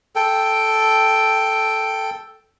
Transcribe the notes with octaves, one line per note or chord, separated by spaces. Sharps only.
A4 G5